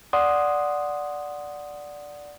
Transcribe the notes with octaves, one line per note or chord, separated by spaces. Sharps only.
D5 F#5 C6 D#6